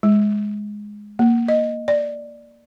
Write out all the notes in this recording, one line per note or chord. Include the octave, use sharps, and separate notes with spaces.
G#3
A#3
D#5
D5